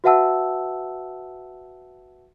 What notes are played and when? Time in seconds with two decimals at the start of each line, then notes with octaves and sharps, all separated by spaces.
0.04 F#4 B4 E5 F#5 A5 E6